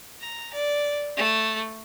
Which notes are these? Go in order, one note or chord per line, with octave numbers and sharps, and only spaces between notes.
A#5
D5
A3